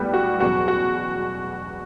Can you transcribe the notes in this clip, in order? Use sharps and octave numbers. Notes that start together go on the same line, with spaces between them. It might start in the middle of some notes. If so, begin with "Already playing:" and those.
Already playing: B1 A2 G3 B3 G4 B4
F#4
E2 B2 F#3 F#4
F#4